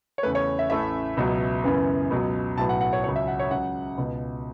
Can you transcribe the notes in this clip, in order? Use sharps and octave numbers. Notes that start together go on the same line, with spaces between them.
C#5
E2 C#3 A3 B4
C#5
E5
A1 A2 A3 C#4 E5
C#2 B2 F#3
F#2 C#3 E3 B3
C#2 B2 F#3
B1 A2 F#3 B3 A5
F#5
F#5
C#5
C#2 C#3 F#3 C#5
E5
F#5
C#5
C#2 C#3 F#3 F#5
C#2 B2 B3